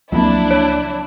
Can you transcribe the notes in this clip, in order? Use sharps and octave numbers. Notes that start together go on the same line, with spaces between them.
C#2 F3 F#3 A#3 C4 D4 E4
C#5